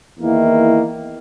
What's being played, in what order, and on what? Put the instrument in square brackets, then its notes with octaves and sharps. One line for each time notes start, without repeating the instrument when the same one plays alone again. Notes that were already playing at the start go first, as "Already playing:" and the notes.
[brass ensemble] E2 D#3 A#3 E4